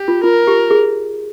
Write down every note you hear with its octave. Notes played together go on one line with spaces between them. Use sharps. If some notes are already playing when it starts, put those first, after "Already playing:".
Already playing: G4
F4
F4 A#4
G4
G#4